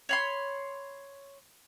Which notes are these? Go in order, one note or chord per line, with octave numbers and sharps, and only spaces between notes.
C#5 B5 C6